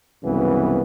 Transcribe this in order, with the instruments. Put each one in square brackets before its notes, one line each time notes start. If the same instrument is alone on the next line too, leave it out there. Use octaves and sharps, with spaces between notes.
[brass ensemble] C2 F#2 C#3 E3 B3